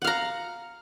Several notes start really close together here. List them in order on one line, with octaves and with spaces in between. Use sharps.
F#5 F5 A#5